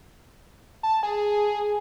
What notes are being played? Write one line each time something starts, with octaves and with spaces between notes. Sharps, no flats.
A5
G#4